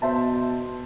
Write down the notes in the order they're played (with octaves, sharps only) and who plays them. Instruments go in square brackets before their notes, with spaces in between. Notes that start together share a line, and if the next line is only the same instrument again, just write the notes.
[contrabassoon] B2 [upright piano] C5 E5 A5